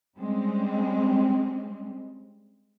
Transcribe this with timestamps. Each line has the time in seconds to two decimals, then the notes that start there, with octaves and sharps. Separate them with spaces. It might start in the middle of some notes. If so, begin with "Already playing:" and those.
0.18 G3 G#3 C4 C#4